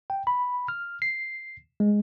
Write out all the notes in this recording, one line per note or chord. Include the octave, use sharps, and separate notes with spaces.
G5
B5
F6
C7
G#3